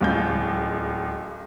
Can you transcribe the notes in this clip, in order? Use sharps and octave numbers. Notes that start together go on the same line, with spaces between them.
D1 C#2 G6